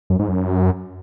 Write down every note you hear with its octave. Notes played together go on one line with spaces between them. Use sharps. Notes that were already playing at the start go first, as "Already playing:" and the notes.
F#2
G#2
F#2